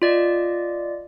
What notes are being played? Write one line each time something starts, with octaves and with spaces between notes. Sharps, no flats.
F4 D5 D#5